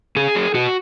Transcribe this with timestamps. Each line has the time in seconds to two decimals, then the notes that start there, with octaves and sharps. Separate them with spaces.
0.16 C#3 G#4
0.35 F#3
0.54 B2 F#4